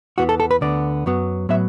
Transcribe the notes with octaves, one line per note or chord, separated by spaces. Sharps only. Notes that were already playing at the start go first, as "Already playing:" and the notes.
E2 E3 B3 F#4
A4
A4
B4
D2 D3 B3 D5
F#2 F#3 B3
A2 F#3 B3 E5